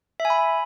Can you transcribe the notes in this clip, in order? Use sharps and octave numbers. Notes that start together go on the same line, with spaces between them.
E5
G#5
B5